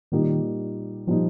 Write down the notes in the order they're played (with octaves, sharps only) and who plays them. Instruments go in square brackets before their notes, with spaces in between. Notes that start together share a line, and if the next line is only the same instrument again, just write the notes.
[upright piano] A#2 G3 A#3 D#4 [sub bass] D#3
[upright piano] A#2 G3 A#3 D#4 [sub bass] F3